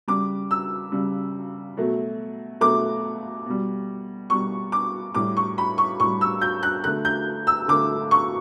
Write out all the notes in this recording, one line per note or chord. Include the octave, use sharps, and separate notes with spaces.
C#3 G3 D6
E6
C#3 G3
B2 F#3 A3
B2 F#3 A3 D6
B2 G3
B2 G3 C#6
D6
A2 G3 D6
C#6
B5
C#6
A2 G3 C#6
E6
G6
F#6
D3 A3 F#6
G6
E6
D3 A3 D6
C#6